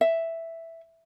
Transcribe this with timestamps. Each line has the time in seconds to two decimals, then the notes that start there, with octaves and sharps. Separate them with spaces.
0.01 E5